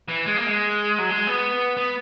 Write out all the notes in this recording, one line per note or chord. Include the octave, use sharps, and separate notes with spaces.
E3
G#3
A#3
G#3
F#3
G#3
B3
B3